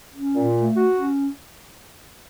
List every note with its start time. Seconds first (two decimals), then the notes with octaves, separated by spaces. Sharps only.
0.14 C#4
0.34 A#2
0.55 A3
0.75 F#4
0.96 C#4